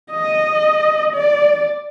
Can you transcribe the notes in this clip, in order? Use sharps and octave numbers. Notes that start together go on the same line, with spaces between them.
D#5
D5